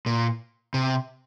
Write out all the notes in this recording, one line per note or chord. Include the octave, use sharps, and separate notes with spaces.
A#2
C3